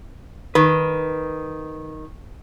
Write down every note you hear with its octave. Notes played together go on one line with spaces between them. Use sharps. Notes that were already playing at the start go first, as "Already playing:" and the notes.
D#3 B4